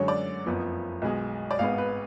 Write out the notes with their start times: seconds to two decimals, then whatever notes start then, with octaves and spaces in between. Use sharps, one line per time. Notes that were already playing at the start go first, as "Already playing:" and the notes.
Already playing: F#2 D3 G#3 C#5
0.08 D5
0.46 F#1 F2 F3 B3
1.02 B1 B2 G#3
1.51 D5
1.59 G#1 G#2 G#3 B3 F5
1.78 B4